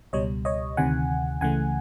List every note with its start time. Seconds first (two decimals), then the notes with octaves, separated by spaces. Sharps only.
0.13 C#2 B2 G3 C#5 D#5
0.45 C#5 D#5
0.77 D2 C3 D#3 F#5 G#5
1.41 C#2 C#3 E3 A3 F#5 G#5